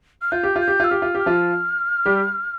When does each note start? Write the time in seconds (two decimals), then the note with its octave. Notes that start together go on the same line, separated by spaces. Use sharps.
0.21 F6
0.31 F4 G6
0.43 G4
0.56 F4
0.61 G6
0.68 G4
0.80 F4 E6
0.90 G4 F6
1.02 F4
1.15 G4 F6
1.26 F3 F4
2.06 G3 G4